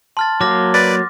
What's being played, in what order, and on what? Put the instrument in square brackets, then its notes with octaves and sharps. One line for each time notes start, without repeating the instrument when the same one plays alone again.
[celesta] A5 [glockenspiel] C6 F6 A6
[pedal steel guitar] F#3 A#3 [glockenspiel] D6 F6 A#6
[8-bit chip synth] B4 D5 [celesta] A6